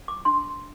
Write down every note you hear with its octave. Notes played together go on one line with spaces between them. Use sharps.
D6
D4 C6